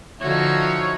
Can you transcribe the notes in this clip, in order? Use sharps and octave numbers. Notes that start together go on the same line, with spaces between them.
D3 F3 D#4 F#4 C#5 E5